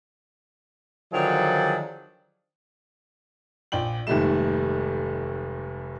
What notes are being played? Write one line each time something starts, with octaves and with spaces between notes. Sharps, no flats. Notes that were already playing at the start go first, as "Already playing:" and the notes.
D3 D#3 F3 F#3 G#4 D5
A#1 D5 G5 F#7
F1 D#2 G#2 G3 A3 E7